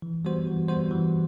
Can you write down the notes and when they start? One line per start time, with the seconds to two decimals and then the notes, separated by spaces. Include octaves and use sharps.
0.02 E3
0.25 G3 B3 F#4 C5
0.47 E3
0.69 G3 B3 F#4 C5
0.91 E3